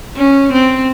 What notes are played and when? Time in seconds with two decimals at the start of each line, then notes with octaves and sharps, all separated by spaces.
0.16 C#4
0.52 C4